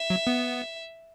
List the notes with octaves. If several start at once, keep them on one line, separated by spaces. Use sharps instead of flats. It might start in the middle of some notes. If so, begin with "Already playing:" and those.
Already playing: E5
F#3
B3